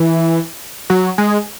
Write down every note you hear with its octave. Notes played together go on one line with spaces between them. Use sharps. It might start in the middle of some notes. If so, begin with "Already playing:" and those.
Already playing: E3
F#3
G#3